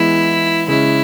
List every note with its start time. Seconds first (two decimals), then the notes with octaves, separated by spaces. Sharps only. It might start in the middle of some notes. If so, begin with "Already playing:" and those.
Already playing: E3 G#3 B3 E4
0.68 C#3 G#3 C#4 E4